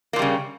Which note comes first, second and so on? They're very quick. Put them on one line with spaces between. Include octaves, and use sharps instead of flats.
A#3 A#2 G3 C#3